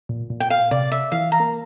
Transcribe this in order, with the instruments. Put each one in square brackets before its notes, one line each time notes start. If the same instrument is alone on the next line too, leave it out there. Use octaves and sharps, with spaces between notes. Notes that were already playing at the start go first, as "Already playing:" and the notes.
[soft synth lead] A#2
A#2
[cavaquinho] G5
F5
[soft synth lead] C3 [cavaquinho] D5
[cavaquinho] E5
[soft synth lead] E3 [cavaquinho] F5
[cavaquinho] A#5
[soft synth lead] A#3